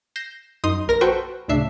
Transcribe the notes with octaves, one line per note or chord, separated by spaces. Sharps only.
G6 A#6 C7 E7
F#2 D#4 C6 D#6
A#1 A#4 A#6
F#4 A4 B4 C5 G5 C#6
D2 A2 C#3 D4 E5 C7